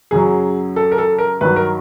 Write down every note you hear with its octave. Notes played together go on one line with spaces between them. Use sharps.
F#2 C#3 F#3 G#4
A4
A#4
A4
A#4
G2 D#3 F#3 B4
A#4